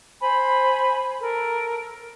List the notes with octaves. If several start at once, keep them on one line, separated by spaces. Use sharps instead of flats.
C5 G#5 B5
A4 A#4